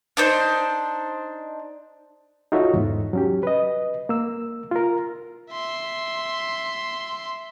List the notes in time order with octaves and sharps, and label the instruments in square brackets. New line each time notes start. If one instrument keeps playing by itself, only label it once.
[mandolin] D4 D#4 C5
[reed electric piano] D#4 F4 F#4 A4 C#5 E5
E2 G#2
F#3 C#4 G4
B4 D#5
A#3 E6
F4 A#4
[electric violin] E5 C6